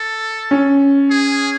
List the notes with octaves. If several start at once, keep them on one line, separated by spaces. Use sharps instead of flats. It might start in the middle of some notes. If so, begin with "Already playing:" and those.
Already playing: A4
C#4
G#4